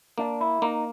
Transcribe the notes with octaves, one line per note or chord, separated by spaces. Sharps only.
A#3 D4
E4
A#3 D#4